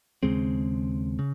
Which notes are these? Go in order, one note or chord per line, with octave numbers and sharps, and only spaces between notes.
D#2 C#3 G#3 C4
C#3